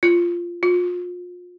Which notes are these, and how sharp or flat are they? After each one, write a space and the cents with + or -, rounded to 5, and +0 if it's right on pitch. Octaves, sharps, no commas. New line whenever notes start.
F4 -10
F4 +30